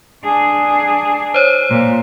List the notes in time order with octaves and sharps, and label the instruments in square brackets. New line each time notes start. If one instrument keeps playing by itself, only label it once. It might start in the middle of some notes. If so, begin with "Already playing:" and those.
[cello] D4 G#4
[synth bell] C5 C#5
[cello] A#2